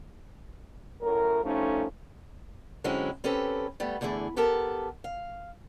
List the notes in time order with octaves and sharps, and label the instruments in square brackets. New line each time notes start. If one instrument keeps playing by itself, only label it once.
[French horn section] F#2 A2 A#4
G2 F3 A3 C#4 D#4 A4
[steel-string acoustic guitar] D3 F#3 G#3 C4 C#4 E4
C4 C#4 G4 A4 B4
G3 A3 B3
E2 D3 A3 E4 G#4
B3 G4 A4 A#4 A5
F5